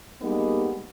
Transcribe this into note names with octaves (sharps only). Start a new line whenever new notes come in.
G3 G#3 A#3 B3 D#4